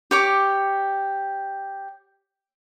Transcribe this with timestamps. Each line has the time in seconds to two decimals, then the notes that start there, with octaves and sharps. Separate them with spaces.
0.11 G4 C#5 D6